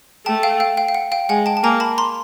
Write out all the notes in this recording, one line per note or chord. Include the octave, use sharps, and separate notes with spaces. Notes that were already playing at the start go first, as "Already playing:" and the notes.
A3 G5 A5
F5 G5
F5 G5
F5 G5
F5
F#5
F5 G5
G#3 F#5 G#5
G5 A5
A5
A#3 G#5 A#5
A5 B5
A#5 C6